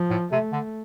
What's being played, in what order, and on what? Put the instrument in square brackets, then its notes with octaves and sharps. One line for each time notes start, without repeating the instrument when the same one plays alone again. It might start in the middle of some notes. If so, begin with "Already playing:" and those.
Already playing: [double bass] F3
[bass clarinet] A2
[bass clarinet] C3 [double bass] A3
[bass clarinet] D3